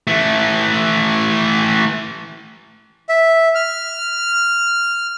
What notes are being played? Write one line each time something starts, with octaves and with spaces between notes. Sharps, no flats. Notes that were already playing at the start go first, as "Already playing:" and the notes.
E3 A3
E5
F6